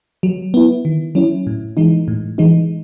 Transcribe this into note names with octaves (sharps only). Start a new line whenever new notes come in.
F#3
B3 E4
D#3
F#3 C#4 E4
A2
E3 G#3 D#4
A2
E3 G#3 D#4